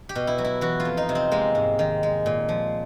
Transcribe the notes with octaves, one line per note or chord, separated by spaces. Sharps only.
G4
B2
E4
F#3
E4
E3 F#4
F4
F2
D#4
C3
C4
G#3 A#3
G#2
D#3
G#3
A#2
F3